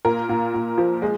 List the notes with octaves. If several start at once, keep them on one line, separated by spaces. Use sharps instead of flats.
A#2 A#4
A#2
A#2
F3
G#3